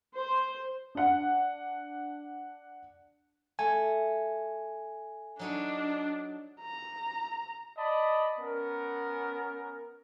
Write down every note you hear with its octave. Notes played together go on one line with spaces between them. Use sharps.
C5
D4 F#5
A3 G#5
F#3 D4 D#4 C#5
A#5
D5 D#5 A5 B5
B3 C#4 A#4